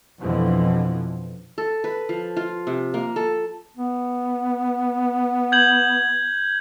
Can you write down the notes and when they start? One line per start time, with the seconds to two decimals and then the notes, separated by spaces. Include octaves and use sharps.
0.19 F2 B2 D3 E3 F3
1.58 A4
1.84 B4
2.09 F3
2.37 F4
2.67 C3
2.94 A#3
3.16 A4
3.77 B3
5.52 G6 G#6 F#7